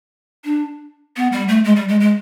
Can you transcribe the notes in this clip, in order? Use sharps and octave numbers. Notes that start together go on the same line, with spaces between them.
D4
B3
G3
A3
G#3
G3
G#3
G#3